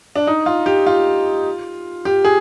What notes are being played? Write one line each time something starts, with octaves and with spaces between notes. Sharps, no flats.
D4
D#4
F4
G4
F4
G4
G#4